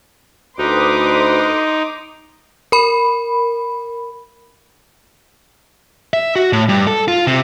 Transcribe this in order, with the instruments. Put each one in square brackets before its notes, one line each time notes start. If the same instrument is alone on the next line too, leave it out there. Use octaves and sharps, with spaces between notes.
[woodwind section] D2 B4 [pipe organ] D#4 [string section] C6 D6 D#6
[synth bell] A#4 B5
[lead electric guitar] E5
F#4
A2
G2
A4
F4
C3